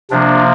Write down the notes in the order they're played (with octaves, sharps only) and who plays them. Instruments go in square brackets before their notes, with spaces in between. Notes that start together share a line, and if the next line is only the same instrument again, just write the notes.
[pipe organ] C3 F3 A#3 D4